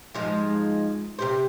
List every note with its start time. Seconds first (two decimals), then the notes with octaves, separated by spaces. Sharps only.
0.15 G#2 F3 G#3
1.19 C3 G4 C5